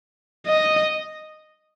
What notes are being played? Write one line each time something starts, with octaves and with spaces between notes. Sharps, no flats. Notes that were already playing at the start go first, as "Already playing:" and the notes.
D#5